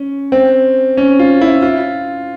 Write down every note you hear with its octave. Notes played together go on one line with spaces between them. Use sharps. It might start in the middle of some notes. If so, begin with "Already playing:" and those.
Already playing: C#4
C4
C#4
F4
E4
F4